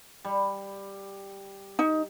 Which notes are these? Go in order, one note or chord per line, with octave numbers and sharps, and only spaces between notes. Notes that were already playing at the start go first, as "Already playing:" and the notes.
G3
D#4